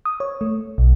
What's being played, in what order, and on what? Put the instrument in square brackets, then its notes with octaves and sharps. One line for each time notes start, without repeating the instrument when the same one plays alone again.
[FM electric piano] D#6
C#5
A3
B1